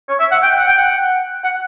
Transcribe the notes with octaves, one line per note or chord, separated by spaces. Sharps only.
C#5
E5
F#5
G5
F#5
G5
F#5
F#5